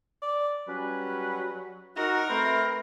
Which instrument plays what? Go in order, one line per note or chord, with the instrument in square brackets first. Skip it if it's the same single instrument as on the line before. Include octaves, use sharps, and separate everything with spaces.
[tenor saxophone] D5
[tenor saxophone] F#3 [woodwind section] G3 C#4 B4
[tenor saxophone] D#4 [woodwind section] F#4 [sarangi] A#4
[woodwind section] A3 C4 [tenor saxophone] B4